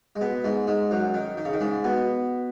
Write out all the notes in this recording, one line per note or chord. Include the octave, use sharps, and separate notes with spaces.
G#3
B2 B3
G#2 G#3
G#2 G#3
F#2 F#3
D#3
D#3
C#3
D#3
G#2 G#3
B2 B3